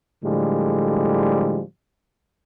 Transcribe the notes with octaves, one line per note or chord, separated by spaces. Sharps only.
A2 D3 F3 G3 G#3